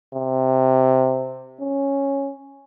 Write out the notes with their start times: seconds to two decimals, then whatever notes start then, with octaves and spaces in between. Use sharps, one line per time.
0.14 C3
1.61 C#4